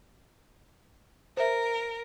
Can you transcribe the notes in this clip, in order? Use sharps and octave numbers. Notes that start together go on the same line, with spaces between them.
A#4 C5 E5